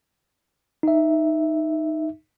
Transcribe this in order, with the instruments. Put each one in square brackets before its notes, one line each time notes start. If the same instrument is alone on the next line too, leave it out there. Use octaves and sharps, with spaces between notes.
[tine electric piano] D#4 E5